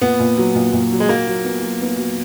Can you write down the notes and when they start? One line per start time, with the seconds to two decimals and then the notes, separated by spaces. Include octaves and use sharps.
0.01 A#2 B3
0.19 A#2
0.37 F#3
0.55 A#2
0.73 A#2
0.92 F#3
1.00 G#3
1.09 F#3 A#3
1.27 F#3
1.44 B3
1.63 F#3
1.81 B3
1.98 F#3